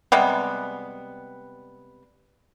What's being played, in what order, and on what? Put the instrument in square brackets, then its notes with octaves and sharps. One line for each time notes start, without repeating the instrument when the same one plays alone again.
[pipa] C3 G3 G#3 B3